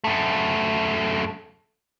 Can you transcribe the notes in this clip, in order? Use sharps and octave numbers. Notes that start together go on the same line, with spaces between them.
F#2 A3